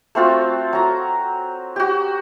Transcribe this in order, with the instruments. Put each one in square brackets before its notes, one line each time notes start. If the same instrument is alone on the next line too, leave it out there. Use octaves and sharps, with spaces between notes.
[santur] A3 C4 F4 F#4
F#3 A#5
F#4 G4